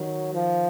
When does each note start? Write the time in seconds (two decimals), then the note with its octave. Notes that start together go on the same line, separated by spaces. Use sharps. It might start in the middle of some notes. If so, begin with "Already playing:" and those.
Already playing: D#3 F#3
0.34 F3